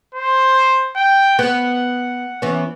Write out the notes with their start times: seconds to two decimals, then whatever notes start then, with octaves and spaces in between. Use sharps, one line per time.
0.15 C5
0.96 G5
1.39 B3 F#5
2.42 E3 B3 C#4